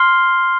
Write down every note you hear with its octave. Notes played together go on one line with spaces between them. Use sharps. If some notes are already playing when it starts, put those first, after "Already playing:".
Already playing: C6 F6 C7 G7